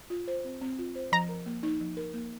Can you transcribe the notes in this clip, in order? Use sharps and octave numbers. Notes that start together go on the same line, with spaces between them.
F4
C5
C4
C4
F4
C5
F3 A#5
A#4
A#3
D#4
F3
A#4
A#3